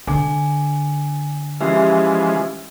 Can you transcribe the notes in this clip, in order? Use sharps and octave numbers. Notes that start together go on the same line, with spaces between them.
D3 G#5 D6
E3 F3 G#3 C#4 G4 E5